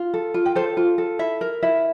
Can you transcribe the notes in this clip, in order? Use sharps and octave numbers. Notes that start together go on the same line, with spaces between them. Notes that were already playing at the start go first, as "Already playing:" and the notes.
Already playing: F4
A4
F4
G5
A4 C5
F4
A4
E4 E5
A#4
E4 E5